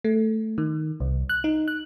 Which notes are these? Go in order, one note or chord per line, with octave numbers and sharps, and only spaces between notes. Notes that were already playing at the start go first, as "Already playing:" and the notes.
A3
D#3
C2
F#6
D#4
F#6